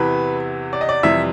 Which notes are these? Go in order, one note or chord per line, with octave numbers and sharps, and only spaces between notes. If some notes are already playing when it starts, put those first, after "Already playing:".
Already playing: E2 C3 E3 B4
D5
D#5
D5
F2 C3 E3 G3 E5